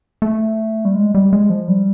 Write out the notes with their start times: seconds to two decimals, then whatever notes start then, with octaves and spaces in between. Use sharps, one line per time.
0.22 A3
0.85 G3
0.95 G#3
1.15 G3
1.33 G#3
1.50 F3
1.68 G3